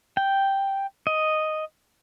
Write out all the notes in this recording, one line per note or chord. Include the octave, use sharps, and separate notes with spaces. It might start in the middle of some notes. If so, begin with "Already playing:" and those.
G5
D#5